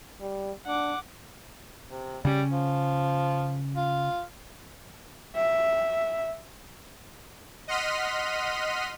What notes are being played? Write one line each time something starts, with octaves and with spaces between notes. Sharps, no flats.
G3
D4 F#5 D6
C3
C#3 G3 C#4
F3
F4
E5
D#5 F#5 C6 F6 B6 D#7